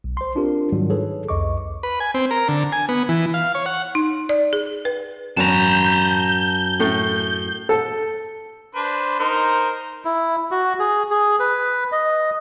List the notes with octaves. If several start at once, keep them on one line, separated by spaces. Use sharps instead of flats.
B1
C5 C6
C4 D4 F4 G4 A#4
G#2 D#3 F#3 G3 F#4
D#4 G#4 A4 B4 C#5
C2 F2 D#5 C#6 D6
B4
G#5
C4
A#4
D3
G#5
B3
E3
F5
C#5
F#5
D#4
D5
G#4
B4
F#2 A5 A#5 G6
A2 A4
A4
D4 B4 C5
D#4 A#4 C5
E4
F#4
G#4
G#4
B4
D#5